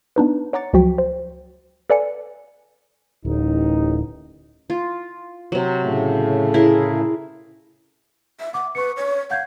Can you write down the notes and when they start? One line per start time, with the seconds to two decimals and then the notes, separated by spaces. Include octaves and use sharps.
0.16 B3 D4 D#4 B4
0.53 C#5 F#5 A#5 D6 A6 C#7
0.73 C#2 F3 F#3 F#4 G5 B6
0.98 C5
1.90 A4 B4 D5 F5 G#5 C#7
3.25 D1 A1 D#2 D#4
4.70 F4
5.52 C3 F#3
5.84 A2 C#3 A3
6.54 E4 G#4 A#4
8.40 E5
8.54 F#5 D6
8.75 B4 C#6 C#7
8.97 C#5
9.30 F5 F#5 G6 G#6